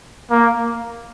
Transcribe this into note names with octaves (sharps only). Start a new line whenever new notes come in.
A#3